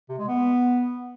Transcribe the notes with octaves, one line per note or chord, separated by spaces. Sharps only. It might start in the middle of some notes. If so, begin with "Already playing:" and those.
C3
G#3
B3